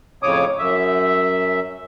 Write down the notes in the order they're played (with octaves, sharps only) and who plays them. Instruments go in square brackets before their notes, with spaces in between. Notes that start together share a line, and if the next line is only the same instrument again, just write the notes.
[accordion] F2 A2 C#3 C#5 D6 D#6
F#2 E5